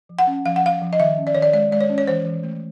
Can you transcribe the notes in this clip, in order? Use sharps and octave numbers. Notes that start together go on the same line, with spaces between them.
F3
F#5
C#4
F3 F5
F#5
F3 F5
F3
D#5
D#3 E5
C#4
D5
D#3 C#5
D5
G#3 D5
G#3 D5
C#5
C#4
C#5
E3 C5
E3
A3